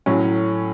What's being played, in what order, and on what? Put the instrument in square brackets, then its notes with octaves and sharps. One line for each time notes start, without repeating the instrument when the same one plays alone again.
[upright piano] A2 F#3 C#4